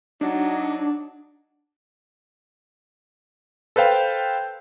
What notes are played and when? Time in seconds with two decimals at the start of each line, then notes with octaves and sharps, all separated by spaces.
0.21 F#3 D4 D#4
3.76 A4 B4 C5 F5 G5